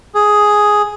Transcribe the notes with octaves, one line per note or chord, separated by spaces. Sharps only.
G#4